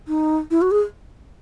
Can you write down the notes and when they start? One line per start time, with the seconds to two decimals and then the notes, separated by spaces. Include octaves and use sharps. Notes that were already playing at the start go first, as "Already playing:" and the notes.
0.08 D#4
0.51 E4
0.62 F#4
0.71 G#4